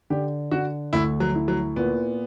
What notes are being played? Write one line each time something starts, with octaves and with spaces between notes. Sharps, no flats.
D3 G4
D3 F#4
D2 E4
F#3
E4
F#3
A#2 B3